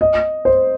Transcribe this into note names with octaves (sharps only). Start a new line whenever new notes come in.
D#5
C5